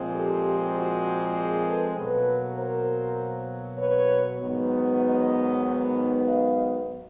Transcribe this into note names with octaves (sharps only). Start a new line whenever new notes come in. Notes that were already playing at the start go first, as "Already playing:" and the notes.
Already playing: A#2 F3 G#3 C4
G4 A4
F#4 G#4
G#4 A#4
A4 B4
B2 F#3 A#3 A4 B4
A#4 C5
B4 C#5
G#2 D#3 F#3 B3
C#5 D#5
D#5 F5